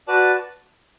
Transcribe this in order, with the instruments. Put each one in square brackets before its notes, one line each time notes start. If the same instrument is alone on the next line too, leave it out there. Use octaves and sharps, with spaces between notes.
[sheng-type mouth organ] F#4 B4 D5 A5